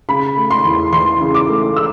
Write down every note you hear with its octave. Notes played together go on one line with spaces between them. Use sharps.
C#3 B5
A3
C6
E2
E3 C6
C#3
D6
A3
E6